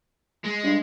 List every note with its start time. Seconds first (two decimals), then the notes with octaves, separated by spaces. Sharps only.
0.44 G#3
0.63 G2